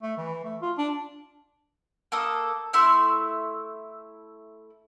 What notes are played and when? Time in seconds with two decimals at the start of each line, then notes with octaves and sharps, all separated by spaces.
0.02 A3
0.17 E3
0.44 A3
0.62 F4
0.77 D4
2.12 A#3 A4 D#6
2.73 A3 E4 E5 C6